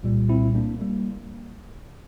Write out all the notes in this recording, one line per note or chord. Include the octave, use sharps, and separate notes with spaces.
C2 A#2 G3
C4 E4
A#3 D4
G3 A#3